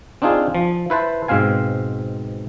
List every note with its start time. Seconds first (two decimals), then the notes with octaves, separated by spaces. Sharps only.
0.22 C4 D4 D#4 F4 G#4
0.55 F3
0.90 E4 B4 C5 A5
1.28 G#2 B2 C4 F5 G#5